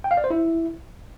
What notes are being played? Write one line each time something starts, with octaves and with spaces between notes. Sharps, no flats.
G5
F5
D5
C5
E4